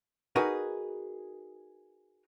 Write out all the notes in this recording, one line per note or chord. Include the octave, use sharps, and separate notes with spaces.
D#4 F#4 G#4 A#4 B4